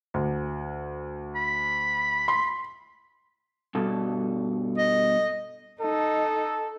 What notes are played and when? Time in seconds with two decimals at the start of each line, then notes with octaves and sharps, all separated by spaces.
0.14 D2
1.36 B5
2.28 C6
3.75 G2 B2 A4
4.78 D#5
5.81 D#4 A4